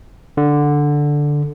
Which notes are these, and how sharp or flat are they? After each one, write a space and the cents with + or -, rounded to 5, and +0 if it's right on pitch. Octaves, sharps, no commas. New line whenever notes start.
D3 +0